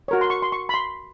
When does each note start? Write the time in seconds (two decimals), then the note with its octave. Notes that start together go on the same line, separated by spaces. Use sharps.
0.08 F#4 A#4 C#5
0.21 C6
0.30 C#6
0.42 C6
0.52 C#6
0.69 B5
0.74 C6